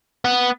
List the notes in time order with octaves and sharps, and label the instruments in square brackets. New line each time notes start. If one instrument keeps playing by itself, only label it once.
[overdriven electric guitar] B3